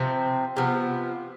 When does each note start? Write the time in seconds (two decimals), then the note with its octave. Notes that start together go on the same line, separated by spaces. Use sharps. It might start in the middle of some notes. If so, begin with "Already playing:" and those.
Already playing: C3 F3 C4
0.57 C3 F3 B3